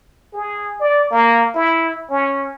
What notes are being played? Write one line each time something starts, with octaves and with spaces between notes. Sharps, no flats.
G#4
D5
A#3
E4
C#4